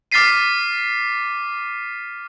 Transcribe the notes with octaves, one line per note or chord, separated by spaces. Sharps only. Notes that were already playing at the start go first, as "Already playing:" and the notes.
D6 F6 A6 B6 C7 D#7